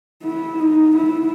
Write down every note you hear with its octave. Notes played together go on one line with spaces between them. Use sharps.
E4
D#4
E4